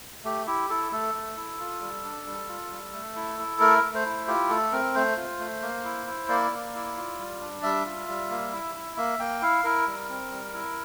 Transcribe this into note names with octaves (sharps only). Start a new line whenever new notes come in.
A3 G4
E4 G4
E4 A4
A3 A4
A3
E4
F4
G3
D4
G3
F4
G3
A3
E4
E4
A3 A#4
A3
C5
E4
F4 G4
A3 A4
C4 A#4
A3 C5
F4
A3
A#3
E4
E4
A#3 D5
A#3
E4
F4
G3
D4
G3 E5
F4
G3
A#3
E4
E4
A#3 E5
A#3 G5
E4 F5
E4 A#4
G3
C4
G3
E4